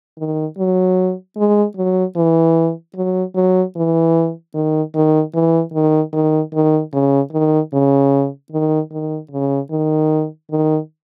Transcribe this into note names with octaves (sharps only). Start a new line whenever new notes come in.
D#3
F#3
G#3
F#3
E3
F#3
F#3
E3
D#3
D#3
E3
D#3
D#3
D#3
C#3
D#3
C#3
D#3
D#3
C#3
D#3
D#3